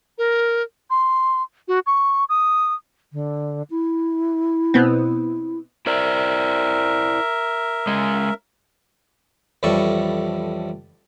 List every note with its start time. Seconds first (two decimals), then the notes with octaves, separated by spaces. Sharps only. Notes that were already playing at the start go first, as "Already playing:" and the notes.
0.18 A#4
0.90 C6
1.68 F#4
1.86 C#6
2.29 D#6
3.13 D3
3.70 E4
4.74 B2 B3 C4
5.86 E4 A#4 C5 D5 E5
7.87 G#3 C#4
9.63 A1 F2 A2 G3 A4 C#6